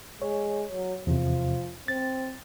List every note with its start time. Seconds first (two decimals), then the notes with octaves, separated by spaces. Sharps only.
0.22 G#3 C#5
0.72 F#3
1.07 E2 C3 F3
1.88 C4 A6